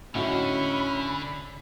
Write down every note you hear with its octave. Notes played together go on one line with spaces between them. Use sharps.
A2 D3 C#4 D#4 F#4 B5